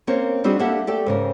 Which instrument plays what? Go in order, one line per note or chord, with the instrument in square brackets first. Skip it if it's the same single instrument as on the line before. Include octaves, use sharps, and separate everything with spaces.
[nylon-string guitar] A#3 C4 C#4 A#4 C5 C#5
G3 C4 D4 D#4 F#4 G#4
A#3 D4 G4 A4 E5 F#5
A3 G4 A4 D5 G5
G#2 C#3 A#4